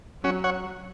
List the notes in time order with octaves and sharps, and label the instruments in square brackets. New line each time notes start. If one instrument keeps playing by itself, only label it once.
[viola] F#3 [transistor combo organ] C#4 F#4
[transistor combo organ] C#5 F#5